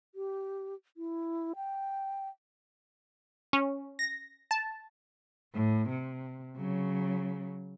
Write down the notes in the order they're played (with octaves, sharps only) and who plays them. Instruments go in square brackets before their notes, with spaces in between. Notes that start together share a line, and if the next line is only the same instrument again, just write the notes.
[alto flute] G4
E4
G5
[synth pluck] C#4
A#6
A5
[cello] A2
C3
C#3 F#3